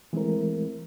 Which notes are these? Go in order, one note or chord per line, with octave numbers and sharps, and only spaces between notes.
E3 G#3 A3 C4 E4 A#4